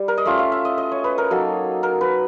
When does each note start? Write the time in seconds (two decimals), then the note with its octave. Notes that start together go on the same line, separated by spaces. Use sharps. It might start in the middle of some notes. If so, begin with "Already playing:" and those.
Already playing: G3
0.08 A#4
0.18 D#5
0.25 A3 C#4 F4 E5
0.39 F5
0.52 E5
0.65 D#5
0.78 D#5
0.92 C#5
1.04 B4
1.18 A#4
1.31 F#3 A#3 D#4 A4
1.83 A#4
2.01 B4